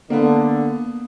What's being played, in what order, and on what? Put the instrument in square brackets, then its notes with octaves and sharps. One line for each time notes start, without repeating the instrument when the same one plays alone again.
[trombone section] D3 [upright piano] A#3 B3